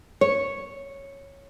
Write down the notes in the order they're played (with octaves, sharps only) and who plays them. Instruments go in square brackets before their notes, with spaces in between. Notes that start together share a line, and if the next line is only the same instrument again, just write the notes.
[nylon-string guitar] C#5